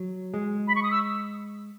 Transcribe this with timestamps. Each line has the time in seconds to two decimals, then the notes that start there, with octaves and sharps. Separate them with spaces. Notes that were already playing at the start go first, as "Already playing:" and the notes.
Already playing: F#3
0.34 G#3
0.68 B5
0.75 C#6
0.83 D#6
0.91 E6